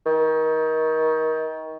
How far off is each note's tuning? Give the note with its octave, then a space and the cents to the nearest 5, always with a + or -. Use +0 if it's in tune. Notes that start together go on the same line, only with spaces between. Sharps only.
D#3 +25